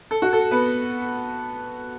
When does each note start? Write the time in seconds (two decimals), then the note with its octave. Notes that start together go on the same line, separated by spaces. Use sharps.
0.11 A4
0.22 F#4
0.33 A4
0.51 B3 B4